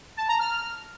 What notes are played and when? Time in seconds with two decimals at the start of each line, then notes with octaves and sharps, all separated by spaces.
0.17 A5
0.28 A#5
0.39 F6